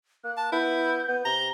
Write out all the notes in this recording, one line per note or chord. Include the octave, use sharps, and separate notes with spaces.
A#3 F#6
A5
B3 E4 G6
B3
C3 A#5 G7